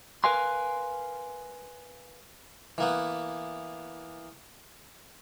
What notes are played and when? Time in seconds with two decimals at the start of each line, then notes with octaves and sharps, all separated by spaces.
0.24 A#4 B4 F5 G#5 C6
2.78 E3 A#3 B3